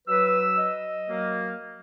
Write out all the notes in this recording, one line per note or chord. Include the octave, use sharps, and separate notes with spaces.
F#3 B4 E6
D#5
F#3 A#3